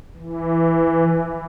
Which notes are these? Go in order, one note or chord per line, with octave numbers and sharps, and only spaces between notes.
E3